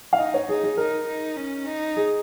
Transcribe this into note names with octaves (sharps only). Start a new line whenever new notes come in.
F5
D#4 D#5
C#5
D#4 G#4
G#4
D#4 A#4
D#4
C#4
D#4
G#4